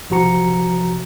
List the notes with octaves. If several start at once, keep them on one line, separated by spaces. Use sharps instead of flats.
B1 C3 F3 F#4 A#5 C#7